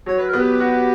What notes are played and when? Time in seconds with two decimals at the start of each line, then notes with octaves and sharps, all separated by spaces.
0.06 F#3 C#5
0.17 B4
0.28 A#4
0.33 B3 G4 B4
0.60 F#4